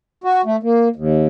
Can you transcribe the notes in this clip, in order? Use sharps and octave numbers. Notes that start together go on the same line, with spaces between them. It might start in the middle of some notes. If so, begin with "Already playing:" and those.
F#4
A3
A#3
D#2